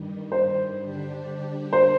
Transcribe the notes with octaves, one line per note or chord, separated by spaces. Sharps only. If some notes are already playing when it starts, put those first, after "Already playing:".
Already playing: G2 D#3 G3
C5
D3 G3 D4 G4
C5